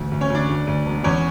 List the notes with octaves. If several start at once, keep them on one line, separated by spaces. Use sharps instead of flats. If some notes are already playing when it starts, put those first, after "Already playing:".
Already playing: A1 D2
D2
C#4 C#5
D2 D4 D5
D2
D2
E1
E2 C#4 C#5